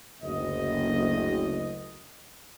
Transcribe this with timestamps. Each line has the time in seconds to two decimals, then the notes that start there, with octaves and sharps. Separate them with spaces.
0.22 F#1 D2 D#5